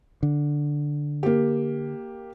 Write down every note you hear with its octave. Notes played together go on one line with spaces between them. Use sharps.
D3
A#3 G4